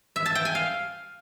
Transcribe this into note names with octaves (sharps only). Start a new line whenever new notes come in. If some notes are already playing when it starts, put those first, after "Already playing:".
E5
A5
G5
G#5
F5